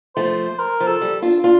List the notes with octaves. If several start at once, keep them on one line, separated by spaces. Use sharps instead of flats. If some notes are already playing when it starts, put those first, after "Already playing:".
F3 A3 C5
A#4
F3
A4
G3
D4 F4
D4 F4